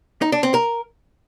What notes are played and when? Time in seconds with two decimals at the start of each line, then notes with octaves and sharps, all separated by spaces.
0.22 D#4
0.32 D4
0.43 C4
0.54 A#4